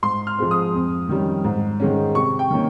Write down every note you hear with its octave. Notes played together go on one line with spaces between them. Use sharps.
G#2 C6
F6
F3 G#3 C4
D#6
F2
D#3 G3 C#4
G#2
D#3 G#3 C#4
C3 C#6
G5
D#3 A#3 C#4